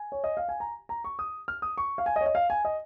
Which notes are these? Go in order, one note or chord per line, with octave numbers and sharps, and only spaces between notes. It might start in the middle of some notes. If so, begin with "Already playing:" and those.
Already playing: G#5
C#5
D#5
F5
G#5
A#5
A#5
C#6
D#6
F6
D#6
C#6
F5
G#5
D#5
C#5
D#5
F5
G#5
D#5